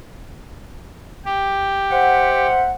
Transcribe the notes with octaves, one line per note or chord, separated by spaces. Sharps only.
G4
C5 E5 F#5